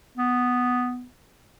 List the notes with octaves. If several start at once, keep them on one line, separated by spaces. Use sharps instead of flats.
B3